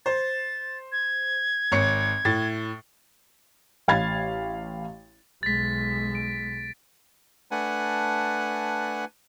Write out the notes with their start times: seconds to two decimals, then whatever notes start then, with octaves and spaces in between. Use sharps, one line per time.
0.06 C5 A6
0.92 G#6
1.72 G#1 C#5 C#7
2.25 A2 A6
3.88 A1 F5 B5 G#6 A6
5.43 B1 G#3 A6 B6
6.15 D7
7.51 A3 D4 B4 F#5 G#5